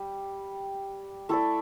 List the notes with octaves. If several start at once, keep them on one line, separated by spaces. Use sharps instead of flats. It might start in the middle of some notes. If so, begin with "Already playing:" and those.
Already playing: G3
A3 E4 A4 D5